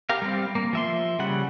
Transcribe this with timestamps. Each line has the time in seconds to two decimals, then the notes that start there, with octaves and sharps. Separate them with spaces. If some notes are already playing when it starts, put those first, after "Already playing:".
0.09 G4 A#4 F5
0.22 G3 C4
0.55 A#3
0.73 F3 E5 C6
1.19 C#3 G3 F#5